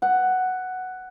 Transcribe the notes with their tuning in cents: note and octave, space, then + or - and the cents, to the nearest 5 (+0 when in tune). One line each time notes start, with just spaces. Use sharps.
F#5 +5